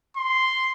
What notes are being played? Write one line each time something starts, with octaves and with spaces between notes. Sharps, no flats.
C6